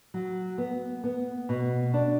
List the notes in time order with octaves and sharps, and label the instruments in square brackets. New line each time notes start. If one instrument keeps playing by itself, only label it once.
[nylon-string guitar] F#3
B3
B3
B2
D4